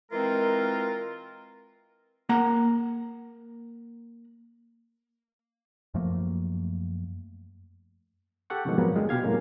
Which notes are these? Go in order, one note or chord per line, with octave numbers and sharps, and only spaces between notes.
E3 G#3 C4 F4 A#4
A#3 F#5 A#5
F#2 F3 A3 A#3
G4 A4 F#5 C#6
F#2 B2 D3 D#3 F3 G#3
F2 G#2 F#3 A#3 B3
D3 G3 G#3 F4
B2 G4 F5 G#6
F#2 A2 D3 G#3 A#3 C#4